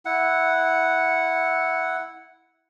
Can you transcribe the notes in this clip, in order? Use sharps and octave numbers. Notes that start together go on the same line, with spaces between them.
E4 F#5